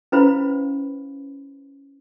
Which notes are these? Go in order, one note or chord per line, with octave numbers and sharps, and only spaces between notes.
C#4 E4 B4 C5 F5 B5